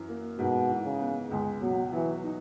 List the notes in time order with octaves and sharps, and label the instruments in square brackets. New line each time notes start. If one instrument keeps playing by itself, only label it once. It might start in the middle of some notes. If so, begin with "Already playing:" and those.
Already playing: [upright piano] F#2 E3
A#3
[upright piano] G#2 [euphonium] B2
[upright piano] E3
[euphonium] C#3
[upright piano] B3
[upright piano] C#2 [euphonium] G#3
[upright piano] B2 [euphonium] F#3
[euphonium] E3 [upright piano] F#3
[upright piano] D#4